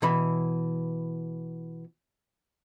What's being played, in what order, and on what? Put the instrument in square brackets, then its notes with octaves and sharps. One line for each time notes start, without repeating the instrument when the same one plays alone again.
[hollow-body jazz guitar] B2 E3 B5